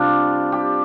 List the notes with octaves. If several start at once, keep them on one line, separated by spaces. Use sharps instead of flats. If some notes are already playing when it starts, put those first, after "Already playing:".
Already playing: C3 G3 D4 F4 G4
G4